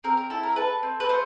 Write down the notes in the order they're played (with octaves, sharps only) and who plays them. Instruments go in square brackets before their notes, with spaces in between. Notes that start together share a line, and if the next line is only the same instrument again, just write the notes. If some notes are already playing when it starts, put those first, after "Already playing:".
[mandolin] C4 A#4
A#4
E4 A4
A#4
A4 B4
C4
B4
A3 C5